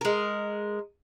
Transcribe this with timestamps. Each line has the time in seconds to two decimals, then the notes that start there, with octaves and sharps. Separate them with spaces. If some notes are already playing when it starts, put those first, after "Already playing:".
0.01 G#3 A#4